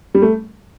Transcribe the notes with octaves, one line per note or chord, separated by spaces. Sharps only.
G3
A3